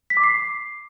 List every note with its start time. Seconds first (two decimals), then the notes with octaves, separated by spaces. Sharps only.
0.10 B6
0.17 D6
0.23 C7